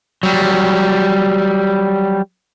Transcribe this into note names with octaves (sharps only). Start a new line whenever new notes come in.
F#3 G3